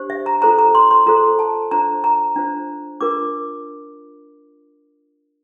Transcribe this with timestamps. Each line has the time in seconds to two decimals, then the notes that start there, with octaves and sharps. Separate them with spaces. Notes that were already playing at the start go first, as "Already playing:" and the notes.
Already playing: D4 G4 C5
0.10 E5
0.26 A#5
0.42 F4 A4 C5 A#5
0.59 A#5
0.75 C6
0.91 C6
1.07 F4 A4 C5 A#5
1.39 A5
1.71 D4 F4 C5 A#5
2.04 A#5
2.36 D4 F4 C5
3.01 D4 F4 A#4 D6